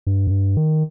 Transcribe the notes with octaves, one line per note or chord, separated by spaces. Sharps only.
G2
F#2
G2
D#3